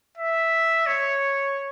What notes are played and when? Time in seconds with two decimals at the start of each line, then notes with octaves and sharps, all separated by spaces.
0.17 E5
0.87 C#5